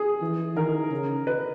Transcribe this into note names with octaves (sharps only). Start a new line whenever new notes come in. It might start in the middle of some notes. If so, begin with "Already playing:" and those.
Already playing: G#4
E3
D#3 A#4
C#3
B4